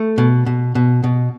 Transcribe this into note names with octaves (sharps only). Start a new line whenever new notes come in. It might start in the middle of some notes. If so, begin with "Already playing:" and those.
Already playing: A3
B2
B2
B2
B2